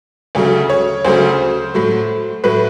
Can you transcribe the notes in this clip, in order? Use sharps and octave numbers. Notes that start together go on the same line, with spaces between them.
D2 C#3 F#3 A3
C#5
D2 C#3 F#3 A3 C5
A2 F#3 A3
A2 F#3 A3 B4